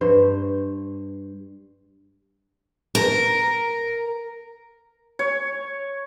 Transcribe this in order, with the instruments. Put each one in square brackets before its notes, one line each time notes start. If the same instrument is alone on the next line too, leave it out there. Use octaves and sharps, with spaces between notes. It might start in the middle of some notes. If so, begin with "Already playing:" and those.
[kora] G2 C5
[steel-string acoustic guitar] A#4
[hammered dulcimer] C#5